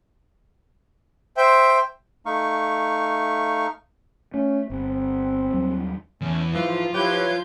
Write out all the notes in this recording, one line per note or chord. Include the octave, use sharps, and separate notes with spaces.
C5 E5 G5
A3 D#4 F5 C#6
A3 C#4
G1 C4
D#2 F#3 G3
E2 A3 C#4
G#2 E3 F3 F4
F3 E4 G4 B4 C#5 G6